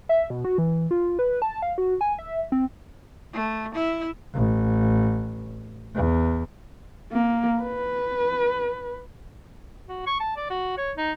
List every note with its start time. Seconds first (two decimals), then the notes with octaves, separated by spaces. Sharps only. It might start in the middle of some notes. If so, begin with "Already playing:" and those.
0.09 E5
0.30 B2
0.45 F#4
0.58 E3
0.91 F4
1.19 B4
1.42 A5
1.62 F5
1.78 F#4
2.01 G#5
2.19 E5
2.52 C4
3.33 A3
3.74 E4 E5
4.35 A1
5.95 E2
7.13 A#3
7.61 B4
9.89 F#4
10.07 C#6
10.20 A5
10.37 D5
10.50 F#4
10.78 C#5
10.97 D#4